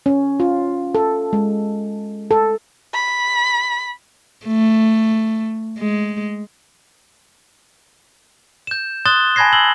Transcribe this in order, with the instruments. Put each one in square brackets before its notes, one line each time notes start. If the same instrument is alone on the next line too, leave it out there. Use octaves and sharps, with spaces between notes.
[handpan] C#4
F4
A4
G#3
A4
[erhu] B5
[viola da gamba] A3
G#3
[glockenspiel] G6 E7
C6 D#6 F#6 A6 E7 G7
G#5 A5 B5 G#6 A#6 C7
E6 F#7 G7